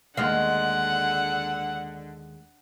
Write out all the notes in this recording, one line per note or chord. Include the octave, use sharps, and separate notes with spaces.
D#2 D3 G#3 F5 F#5